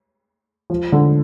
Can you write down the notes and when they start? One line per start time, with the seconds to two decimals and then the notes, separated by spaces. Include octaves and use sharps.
0.70 F3
0.92 D3